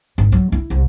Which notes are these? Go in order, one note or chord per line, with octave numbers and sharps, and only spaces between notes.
G#1
F#3
E4
C2